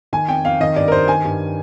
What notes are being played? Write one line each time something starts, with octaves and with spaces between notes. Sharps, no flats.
D#3 G#5
F2 G5
F2 F5
D#3 D#5
G2 D5
A#4
G2 C5
D#3 G#5
G2